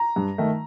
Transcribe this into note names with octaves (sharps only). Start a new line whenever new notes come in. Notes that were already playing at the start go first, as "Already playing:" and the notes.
Already playing: A#5
G2
D#3 A3